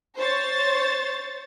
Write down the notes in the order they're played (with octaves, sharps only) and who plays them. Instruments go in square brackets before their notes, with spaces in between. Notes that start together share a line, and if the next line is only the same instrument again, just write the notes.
[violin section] C5 C#5 A6